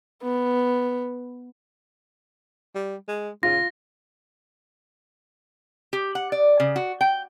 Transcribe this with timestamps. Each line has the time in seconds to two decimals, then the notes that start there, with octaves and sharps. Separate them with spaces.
0.23 B3
2.75 G3
3.08 G#3
3.43 C#3 F4 A#6
5.93 G4
6.15 F#5
6.32 D5
6.60 C#3
6.76 F#4
7.01 G5